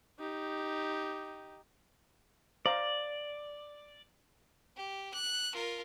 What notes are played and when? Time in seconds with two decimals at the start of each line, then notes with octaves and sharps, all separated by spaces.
0.19 D#4 G4
2.66 C5 D5 F5 A#5
4.76 G4
5.14 F#6
5.54 F4 A#4